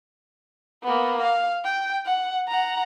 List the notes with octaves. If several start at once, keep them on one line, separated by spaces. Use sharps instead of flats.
A#3 B3
F5
G5
F#5
F#5 A#5